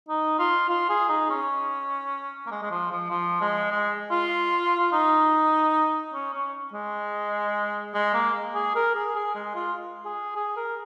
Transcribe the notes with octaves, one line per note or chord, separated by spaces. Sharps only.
D#4
F4
F4
G#4
D#4
C#4
A#3
G#3
G#3
F3
F3
F3
G#3
G#3
F4
F4
D#4
C#4
C#4
G#3
G#3
A#3
G#4
A#4
G#4
G#4
G#3
F4
G#4
G#4
A#4